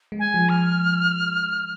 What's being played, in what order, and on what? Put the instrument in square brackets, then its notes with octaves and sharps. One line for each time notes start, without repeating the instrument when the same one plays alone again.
[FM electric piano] G#3
[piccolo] G#5
[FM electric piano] F3
[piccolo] F6